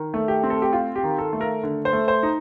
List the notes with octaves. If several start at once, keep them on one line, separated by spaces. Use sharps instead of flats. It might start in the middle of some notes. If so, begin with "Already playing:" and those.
Already playing: D#3
A3
G4
C4
A4
G4
F4
G4
D#3
A4
A3
A#4
D3
C5
A3
C5
D#4